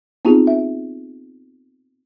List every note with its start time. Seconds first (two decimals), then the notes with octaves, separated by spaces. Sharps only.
0.25 B3 C4 D#4 F4 G4 G#4
0.47 E5